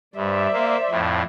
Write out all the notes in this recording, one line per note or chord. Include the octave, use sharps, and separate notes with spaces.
G2 C5 D5 E5
A#3
F2 A2